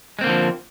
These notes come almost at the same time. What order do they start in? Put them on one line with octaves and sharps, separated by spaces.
G#3 C4 A#3 D3 F3